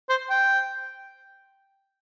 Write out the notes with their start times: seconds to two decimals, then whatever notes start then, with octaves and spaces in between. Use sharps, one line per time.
0.09 C5
0.30 G5